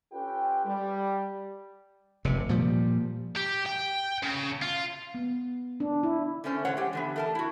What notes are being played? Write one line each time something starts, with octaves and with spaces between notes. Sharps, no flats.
C#4 F4 G4 A4 B4 G5
G3
F1 C3
A#2 F3 G3
G4
G5
C#3
F4
B3
D4
E4
D3 A3 C#4 C5
A2 E3 C5 C#5 F#5
G#3 G4
D3 E3 B3
A3 A#4 A5
E4 F#4